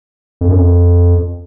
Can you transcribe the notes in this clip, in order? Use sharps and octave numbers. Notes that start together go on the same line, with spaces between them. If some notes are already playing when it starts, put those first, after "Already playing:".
F2
F#2
F2